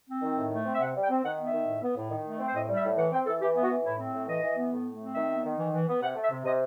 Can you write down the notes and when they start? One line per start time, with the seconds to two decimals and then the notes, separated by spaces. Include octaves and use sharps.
0.09 C4
0.22 D#3
0.37 A2
0.52 A3
0.66 C4
0.74 E5
0.80 C3 F#5
0.95 G3
1.03 G5
1.10 C4
1.24 D#3 F#5
1.38 B3
1.46 E5
1.53 D#3
1.67 A2
1.82 B3
1.97 A2
2.11 D#3
2.26 A3
2.40 C4
2.47 C5
2.54 A2 D#5
2.69 G3
2.76 E5
2.83 A2
2.97 E3 F#5
3.12 C4 G5
3.26 E3 A4
3.41 E3 G4
3.55 B3
3.63 F#4
3.70 E3
3.84 A2 E4
3.99 C4
4.14 A2
4.28 E3 D#5
4.42 E3
4.57 B3
4.71 A2
4.86 A3
5.00 C4
5.15 D#3 E5
5.29 B3
5.44 D#3
5.58 E3
5.72 E3
5.87 B3
6.01 C3 F#5
6.16 A3
6.23 E5
6.31 C3
6.45 C3 D#5